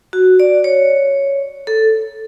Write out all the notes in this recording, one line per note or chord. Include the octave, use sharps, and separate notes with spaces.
F#4
D5
C#5
A4